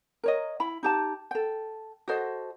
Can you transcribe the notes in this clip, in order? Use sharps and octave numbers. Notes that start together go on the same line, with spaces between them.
A#4 C#5 D#5
E4 B5
D#4 G4 A5
A4 G5
F#4 A4 C5 D#5